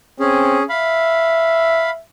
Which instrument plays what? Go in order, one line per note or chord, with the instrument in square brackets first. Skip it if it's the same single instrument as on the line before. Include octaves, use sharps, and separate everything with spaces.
[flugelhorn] C4 [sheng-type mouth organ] C#4 G#4
[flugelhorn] E5 [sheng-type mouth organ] F5 B5